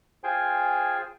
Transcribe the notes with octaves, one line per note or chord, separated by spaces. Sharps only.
F4 G#4 C5 G5 G#5